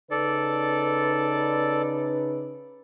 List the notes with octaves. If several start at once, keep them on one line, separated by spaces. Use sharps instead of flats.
C#3 D#4 A4 B4 D5